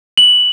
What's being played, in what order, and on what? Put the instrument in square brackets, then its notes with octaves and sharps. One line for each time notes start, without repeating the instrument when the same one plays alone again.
[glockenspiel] F#7